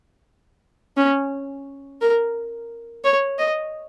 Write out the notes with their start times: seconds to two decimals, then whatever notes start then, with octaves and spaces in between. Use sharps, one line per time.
0.97 C#4
2.01 A#4
3.04 C#5
3.39 D#5